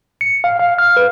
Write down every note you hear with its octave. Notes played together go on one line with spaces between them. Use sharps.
C#7
F5
F5
F6
B4